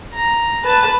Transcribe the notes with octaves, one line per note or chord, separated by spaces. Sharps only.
A#5
B4 A5